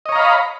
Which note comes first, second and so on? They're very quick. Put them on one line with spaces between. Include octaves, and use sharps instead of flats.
D#5 C#5 A#5 F5 B5